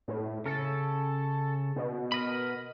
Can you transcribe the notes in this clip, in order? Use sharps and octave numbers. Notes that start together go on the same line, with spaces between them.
A2
C#3 A4
B2
A#4 D#5 B5